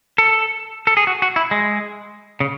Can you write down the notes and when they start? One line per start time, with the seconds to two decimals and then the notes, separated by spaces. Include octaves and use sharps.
0.18 A4
0.87 A4
0.97 G#4
1.07 F#4
1.22 F#4
1.36 E4
1.51 G#3
2.40 C#3